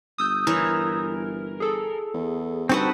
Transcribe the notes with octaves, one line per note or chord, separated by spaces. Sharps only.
G1 D#6 E6 G6
E3 A#4 C#5
G#4 A4
E2
G2 C4 D#4 F#4 A4 B4 F#5